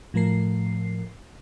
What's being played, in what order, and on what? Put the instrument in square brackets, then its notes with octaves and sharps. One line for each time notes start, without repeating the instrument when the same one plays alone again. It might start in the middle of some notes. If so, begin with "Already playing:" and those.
[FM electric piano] A2 F3 A3 A#4 C7